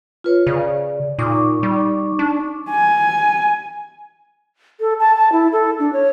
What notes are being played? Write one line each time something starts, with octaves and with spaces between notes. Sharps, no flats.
F4 B4 C#5
C#3 D5
A#2 D#4 C#6 D6
G3
D4
G#5
A4
A5
A5
E4
A4
D4
C#5